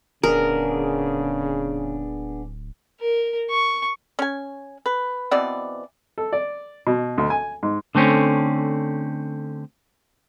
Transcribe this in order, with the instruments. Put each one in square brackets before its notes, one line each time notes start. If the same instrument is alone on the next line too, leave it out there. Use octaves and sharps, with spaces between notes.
[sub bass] D1 [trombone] C#3 [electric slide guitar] B3 D4 G#4 [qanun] A#4
[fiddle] A#4
C#6
[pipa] C#4 G#5
B4
B2 E3 C4 D5
[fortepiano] A4
D5
B2
D2
G#5
G#2
[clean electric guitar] D3 A3 C4 C#4